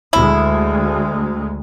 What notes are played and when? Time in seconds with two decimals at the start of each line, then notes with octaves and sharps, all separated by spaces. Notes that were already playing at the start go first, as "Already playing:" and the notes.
0.13 D2 G#3 E4